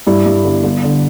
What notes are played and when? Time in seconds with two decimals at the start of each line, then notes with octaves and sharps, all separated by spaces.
0.07 G2 E4
0.26 G2
0.45 G1
0.64 G1
0.83 D3